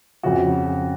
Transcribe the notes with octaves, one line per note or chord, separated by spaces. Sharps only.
F2 C#3 F3 F#4